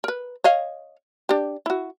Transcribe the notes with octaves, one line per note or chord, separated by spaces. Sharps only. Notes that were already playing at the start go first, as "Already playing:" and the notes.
A#4 B4
C#5 D#5 F5
D4 G4
E4 F#4